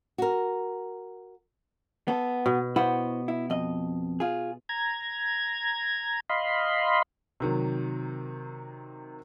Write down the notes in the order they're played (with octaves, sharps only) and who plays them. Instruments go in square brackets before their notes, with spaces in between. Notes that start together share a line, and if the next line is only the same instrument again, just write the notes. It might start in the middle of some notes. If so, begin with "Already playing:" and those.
[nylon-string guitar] F#4 A#4
[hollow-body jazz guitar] B3 A4
[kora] B2
[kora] B3 [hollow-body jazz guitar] E4 F#4 C5
[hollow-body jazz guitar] E4
F2 D#5
F4 G#4
[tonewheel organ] A#5 G#6
D#5 F5 B5 C6
[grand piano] C3 D#3 F#3